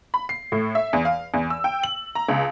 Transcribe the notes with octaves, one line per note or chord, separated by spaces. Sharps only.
B5
C7
A2
E5
E2
F5
E2
E6
G5
F#7
A#5
C#2